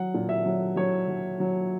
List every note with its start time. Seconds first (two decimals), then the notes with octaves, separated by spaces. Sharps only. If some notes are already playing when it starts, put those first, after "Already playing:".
Already playing: F#3 F#5
0.14 A#2
0.29 E5
0.46 F#3
0.76 F#3 C#5
1.08 F#3
1.40 F#3